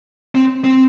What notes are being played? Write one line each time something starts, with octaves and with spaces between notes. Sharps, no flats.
C4
C4